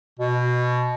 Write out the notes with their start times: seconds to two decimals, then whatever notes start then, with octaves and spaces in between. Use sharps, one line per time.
0.19 B2